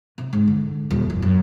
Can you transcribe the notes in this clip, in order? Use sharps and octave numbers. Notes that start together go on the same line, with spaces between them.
C3
G#2
D3
D#1
F#1
F#2